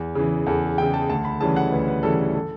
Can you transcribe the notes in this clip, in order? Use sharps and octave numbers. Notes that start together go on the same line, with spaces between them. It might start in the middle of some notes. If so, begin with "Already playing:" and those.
Already playing: E2
C#3 E3
E2 A4
C#3 E3 G5
A5
D2 A5
B5
C#3 E3 G3 C#4 A5
F#5
D2 B4
B4
C#3 E3 G3 C#4 A4
A4
A4